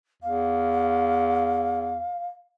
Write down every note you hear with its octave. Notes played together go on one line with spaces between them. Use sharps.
E2 F5